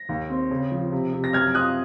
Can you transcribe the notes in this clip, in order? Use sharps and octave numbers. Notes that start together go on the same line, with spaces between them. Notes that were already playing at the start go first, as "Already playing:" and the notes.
Already playing: A#6
D#2
C4
C#3
F3
C3
C3
A#6
F#2 F6 G#6
F4 D#6 F#6